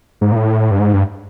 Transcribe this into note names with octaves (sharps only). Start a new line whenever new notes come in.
G#2
A#2
A2
G2
G#2
G2